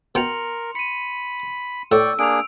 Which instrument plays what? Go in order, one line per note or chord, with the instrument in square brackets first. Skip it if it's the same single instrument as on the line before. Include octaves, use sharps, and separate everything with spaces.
[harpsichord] B2 G5 [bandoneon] A#4 [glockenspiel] C6 C#7 F7
[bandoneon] B5 [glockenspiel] C#7 D#7
[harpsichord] A2 [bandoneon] D5 G5 C#6 [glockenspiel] E6
[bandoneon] A#3 D4 G#4 [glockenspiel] D7 F7